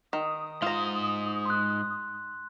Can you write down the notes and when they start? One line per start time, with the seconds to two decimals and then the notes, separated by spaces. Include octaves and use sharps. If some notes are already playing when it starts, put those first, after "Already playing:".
0.13 D#3 D#6
0.62 G#2 F4 C5 A#5
1.46 C6 F#6